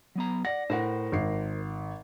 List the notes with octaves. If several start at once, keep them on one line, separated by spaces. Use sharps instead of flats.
F#3 B3 A#5
D5 F#5 A#6
A2 A#4 C5 F#5
G#1 C7